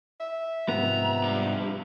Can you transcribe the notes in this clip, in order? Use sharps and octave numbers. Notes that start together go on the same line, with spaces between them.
E5
G#2 C3 F3 B3 A#5
G2